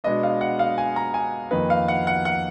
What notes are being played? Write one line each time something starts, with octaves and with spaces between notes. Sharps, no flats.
B2 G#3 B3 D4 D#5
F5
F#5
F5
G#5
A#5
G#5
F2 D#3 A#3 D#4 B4
F5
F#5
F#5
F#5